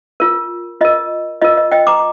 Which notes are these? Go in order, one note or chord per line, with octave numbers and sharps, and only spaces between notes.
F4 A#4
F4 A#4 D#5
F4 A#4 D#5
D#5
D#5 G5
A#5 D6